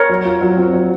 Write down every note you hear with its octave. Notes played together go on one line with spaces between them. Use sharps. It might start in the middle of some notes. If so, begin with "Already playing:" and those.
Already playing: A#4 C#5
F#3
F4
F#3
C4
F#3